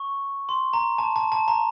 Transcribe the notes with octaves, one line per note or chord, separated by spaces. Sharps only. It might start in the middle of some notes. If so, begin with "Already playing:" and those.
Already playing: C#6
C6
A#5
A5
A5
A5
A#5